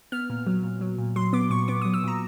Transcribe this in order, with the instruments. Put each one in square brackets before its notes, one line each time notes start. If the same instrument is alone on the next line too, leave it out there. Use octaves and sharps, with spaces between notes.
[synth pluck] B3 F6
A#2
F#3
A#2
F#3
A#2
F#3 C6
B3 D6
A#2 C#6
B3 D6
D#6
F#3
E6
A#2 A#5